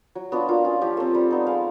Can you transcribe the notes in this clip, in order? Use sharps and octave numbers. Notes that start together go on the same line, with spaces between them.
F#3
B3 D4 F4 F#4
A#3 F4
C#4 F4
F3 G4
A3 C4
G3
B3 D#4
G#3 F5